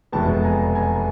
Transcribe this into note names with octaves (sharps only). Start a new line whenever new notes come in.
F1 E2 B2 G#3 B3 G5 A5
G#5 A#5
G#5 A#5